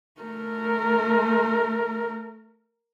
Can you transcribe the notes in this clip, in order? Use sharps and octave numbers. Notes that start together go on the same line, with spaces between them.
A3 A#4